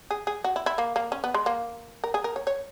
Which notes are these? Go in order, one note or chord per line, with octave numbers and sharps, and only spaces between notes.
G#4
G#4
F#4
E4
E4
A#3
A#3
C#4
B3
G#3
A#3
A#4
G#4
A#4
C#5
C#5